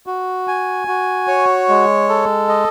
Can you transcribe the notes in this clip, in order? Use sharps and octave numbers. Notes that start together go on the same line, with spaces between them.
F#4
G#5
F#4
C#5
G#3
A4
D#5